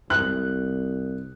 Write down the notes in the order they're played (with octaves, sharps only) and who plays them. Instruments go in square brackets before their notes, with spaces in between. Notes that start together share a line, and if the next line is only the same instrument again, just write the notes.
[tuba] C2 [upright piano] F#6